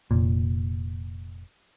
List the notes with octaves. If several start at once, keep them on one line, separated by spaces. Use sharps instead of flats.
F1 A#2